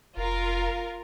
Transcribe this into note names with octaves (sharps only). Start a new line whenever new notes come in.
F1 F4 A#4